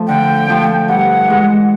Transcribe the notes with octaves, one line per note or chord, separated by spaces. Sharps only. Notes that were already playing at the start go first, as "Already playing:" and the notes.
Already playing: F3 A3
D3 G5
F3 A3
G2 F#5
E3 G#3